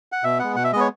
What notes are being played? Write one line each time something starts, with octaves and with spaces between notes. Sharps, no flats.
F#5
B2 E5
G#3 B3 F#5
B2 F#5
E5
G#3 B3 C#5 D#5